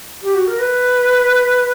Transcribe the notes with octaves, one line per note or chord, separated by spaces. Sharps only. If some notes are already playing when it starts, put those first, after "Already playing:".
G4
F#4
A#4
B4